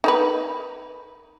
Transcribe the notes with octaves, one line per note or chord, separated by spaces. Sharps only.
D#4 A#4 B4